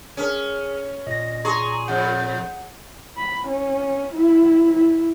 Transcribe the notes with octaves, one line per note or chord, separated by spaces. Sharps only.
C#4 G#4 A#4
A#2 D#5 A#6
G#4 A#5 C6 C#6
F2 F#5 G6
B5
C#4
E4
E4